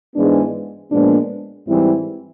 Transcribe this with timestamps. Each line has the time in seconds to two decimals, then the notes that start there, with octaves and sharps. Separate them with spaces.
0.15 G#2 E3 G#3 B3 D4
0.90 A#2 F3 G#3 B3 D4
1.66 G#2 E3 G3 C4 E4